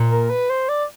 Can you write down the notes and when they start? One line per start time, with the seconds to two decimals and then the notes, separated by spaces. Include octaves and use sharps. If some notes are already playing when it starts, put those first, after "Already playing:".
Already playing: A#2
0.11 A#4
0.30 B4
0.50 C5
0.69 D5